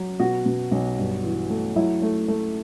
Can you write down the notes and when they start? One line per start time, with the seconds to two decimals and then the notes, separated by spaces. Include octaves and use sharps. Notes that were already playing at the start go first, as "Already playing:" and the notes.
Already playing: F#3
0.20 B2 F#4
0.46 B2
0.71 B1
0.98 G2
1.24 E3
1.50 A3
1.76 F#3 E4
2.02 A3
2.28 A3